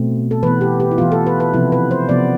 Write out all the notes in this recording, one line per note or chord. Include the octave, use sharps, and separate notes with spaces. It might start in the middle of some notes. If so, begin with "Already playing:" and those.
Already playing: B2 A3 C4
A4
E3 B3 B4
G4
G4
E4
E3 B3 F4
A4
B4
B4
C3 F3 B3 E4
B4
C5
C3 F3 B3 D5